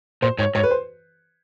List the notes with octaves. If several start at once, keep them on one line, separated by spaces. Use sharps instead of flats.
A#2 C5
G#2 C#5
G#2 C#5
B4
C5